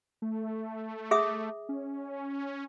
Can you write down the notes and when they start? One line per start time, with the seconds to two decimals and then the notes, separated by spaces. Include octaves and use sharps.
0.22 A3
1.11 G#4 E5 D#6
1.69 C#4